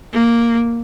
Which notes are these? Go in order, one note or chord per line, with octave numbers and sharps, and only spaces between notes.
A#3